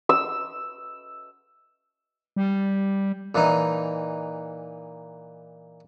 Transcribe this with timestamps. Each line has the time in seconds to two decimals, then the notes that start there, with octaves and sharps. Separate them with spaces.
0.09 E6
2.36 G3
3.35 A#2 E3 D#4